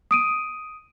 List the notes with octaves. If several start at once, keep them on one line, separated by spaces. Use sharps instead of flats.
D#6 D7 D#7